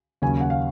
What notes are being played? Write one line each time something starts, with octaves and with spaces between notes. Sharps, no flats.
D#2 C#3 F#3 C#4 G#5
F#5
F5